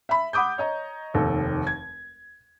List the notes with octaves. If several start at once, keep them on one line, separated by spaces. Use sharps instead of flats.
E5 B5
F#5 B5 D6 D#6 G6
C#5 D#5 A#5
F1 D#2 A4
G#6